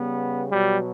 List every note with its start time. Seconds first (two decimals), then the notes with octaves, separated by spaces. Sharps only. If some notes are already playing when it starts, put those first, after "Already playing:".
Already playing: C#3 G3 B3
0.49 B2 F#3 G3